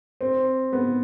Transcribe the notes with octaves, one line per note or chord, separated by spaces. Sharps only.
C4
B3